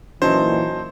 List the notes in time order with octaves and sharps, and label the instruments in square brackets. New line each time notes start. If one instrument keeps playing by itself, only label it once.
[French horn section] A#2 E3 [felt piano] F#3 D#4 A5 [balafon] C#4 [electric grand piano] C5